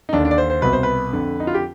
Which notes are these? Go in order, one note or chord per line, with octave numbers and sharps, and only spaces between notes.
D#4
D#2 D3 D4
D4
D5
C5
C5
C2 B2 B4
C5
B4
F2 D3
D#4
F4
G4